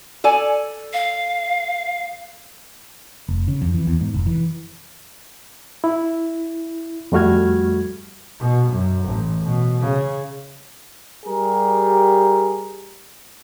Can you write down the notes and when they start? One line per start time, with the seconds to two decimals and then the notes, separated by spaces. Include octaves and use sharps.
0.24 A4 D5 G#5
0.93 F5
3.29 F1
3.48 C#3
3.62 F2
3.74 E3
3.87 E2
4.01 G#2
4.14 F1
4.27 E3
5.84 E4
7.12 F2 G3 A3 F#4 F6 G#6
8.40 B2
8.71 F#2
9.05 A1
9.44 B2
9.80 C#3
11.25 G3 G4 G#4 A#4